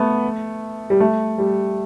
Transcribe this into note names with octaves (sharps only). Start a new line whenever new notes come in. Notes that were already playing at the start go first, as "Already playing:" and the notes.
Already playing: A3 B3
G3
A3
G3